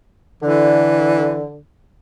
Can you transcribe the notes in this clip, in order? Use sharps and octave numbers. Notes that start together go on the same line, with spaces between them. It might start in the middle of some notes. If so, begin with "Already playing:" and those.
D3 E3